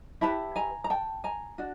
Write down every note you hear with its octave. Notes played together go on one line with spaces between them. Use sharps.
E4 G4 B4 A5 B5
G#5 A#5
A#5
G5 A5
G#5 A#5
D4 F#4